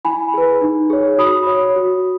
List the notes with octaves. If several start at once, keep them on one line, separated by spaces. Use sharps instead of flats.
E4 G#5 B5
G#4 B4
D#4
G#4 C#5
F#4 B5 D#6
C#5
F#4